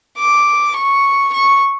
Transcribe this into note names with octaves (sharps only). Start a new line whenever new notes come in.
D6
C#6
C#6